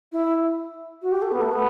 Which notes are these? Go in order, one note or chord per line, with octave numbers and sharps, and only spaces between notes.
E4
F#4
G4
A4
B3
A3
B3